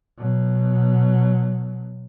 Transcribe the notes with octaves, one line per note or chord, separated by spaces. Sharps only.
B2 F#3